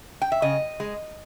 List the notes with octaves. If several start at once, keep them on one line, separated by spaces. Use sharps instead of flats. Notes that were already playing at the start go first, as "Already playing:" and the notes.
G5
E5
C#3 D#5
G#3